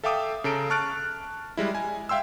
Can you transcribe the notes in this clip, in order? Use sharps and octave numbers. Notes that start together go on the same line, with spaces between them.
A4 E5 F5 G5 D6 D#6
C#3 A4 A#5 D7
A5 C#6 F6 F#6 A6 D7
G3 G#3 E4
G#5
E5 F5 G5 C6 E6